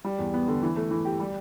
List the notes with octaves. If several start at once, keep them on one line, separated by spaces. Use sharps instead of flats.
G3
E2
B3
D3
E3
A3
E3
G4
G3